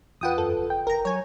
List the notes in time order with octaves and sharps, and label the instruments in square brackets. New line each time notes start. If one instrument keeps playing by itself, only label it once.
[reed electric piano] E2 F4 B4 [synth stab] F#5 G5 D#6
[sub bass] F#2 [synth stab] A4
[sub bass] F1
[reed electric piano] G5
[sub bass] F#1 [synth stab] A#4 A#5
[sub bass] F#3 [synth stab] C#5 G#5